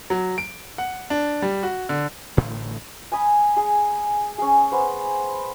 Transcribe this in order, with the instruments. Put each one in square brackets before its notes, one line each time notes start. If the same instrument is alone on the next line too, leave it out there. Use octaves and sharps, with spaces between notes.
[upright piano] F#3
D7
F#5
D4
G3
F#4
D3
[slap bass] A1 A2 D3 A3
[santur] G#5 B5 D#6
G#4
C#4 G#4
B3 C5